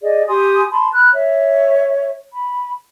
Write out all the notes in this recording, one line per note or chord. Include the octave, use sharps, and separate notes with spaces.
G#4 D5 D#5
G4 G#5 C6 D#6
A5 B5 C6
B5 F6 F#6
C#5 E5
B5